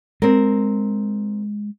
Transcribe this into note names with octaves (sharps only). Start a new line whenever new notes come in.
G#3 C4 A#4